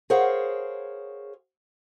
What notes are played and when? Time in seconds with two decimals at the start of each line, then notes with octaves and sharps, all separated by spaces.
0.10 G#4 A#4 C5 C#5 F5 F#5